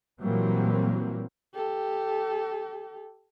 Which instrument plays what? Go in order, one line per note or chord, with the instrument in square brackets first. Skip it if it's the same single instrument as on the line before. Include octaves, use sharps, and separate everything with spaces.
[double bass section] A#2 E3 F#3 G3 A#3 C4
[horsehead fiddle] G4 A4